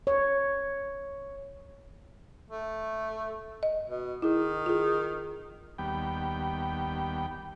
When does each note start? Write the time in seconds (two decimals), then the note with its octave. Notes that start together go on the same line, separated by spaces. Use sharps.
0.07 C#5
2.50 A3
3.63 D#5
3.87 B2
4.22 D#3 E4 G#4
4.66 F4 G#4
5.78 D#2 G3 B3 G5